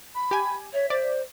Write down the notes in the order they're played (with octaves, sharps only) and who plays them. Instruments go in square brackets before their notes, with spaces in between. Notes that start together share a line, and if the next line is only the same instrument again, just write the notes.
[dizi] B5
[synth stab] G4 G#5
[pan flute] C#5 [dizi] E5
[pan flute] C5 [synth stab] D5